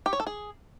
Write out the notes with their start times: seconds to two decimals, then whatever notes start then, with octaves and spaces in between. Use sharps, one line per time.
0.06 G4
0.13 C#5
0.20 A4
0.27 G#4